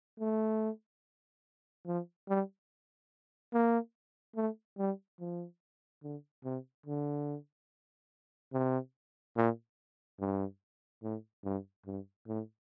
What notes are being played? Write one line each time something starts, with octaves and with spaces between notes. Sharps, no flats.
A3
F3
G3
A#3
A3
G3
F3
D3
C3
D3
C3
A#2
G2
A2
G2
G2
A2